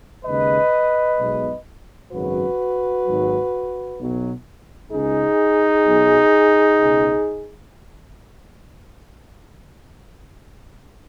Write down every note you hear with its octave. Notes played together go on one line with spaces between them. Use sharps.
D#2 C#3 G#3 B4 D#5
B1 B2 G#3
G#1 F#2 C#3 F#3 F#4 B4
G#1 G#2 F#3
B1 B2 F#3
C#2 C#3 G#3 D#4 G#4
B1 B2 F#3
C#2 B2 G#3